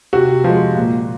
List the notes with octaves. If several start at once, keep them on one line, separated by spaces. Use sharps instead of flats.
C3 F#4
F3 G#3
A#2